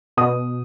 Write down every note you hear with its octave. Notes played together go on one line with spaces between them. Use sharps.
B2 D#6